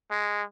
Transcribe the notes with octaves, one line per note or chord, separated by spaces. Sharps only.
G#3